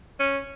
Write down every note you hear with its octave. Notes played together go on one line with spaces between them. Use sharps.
C#4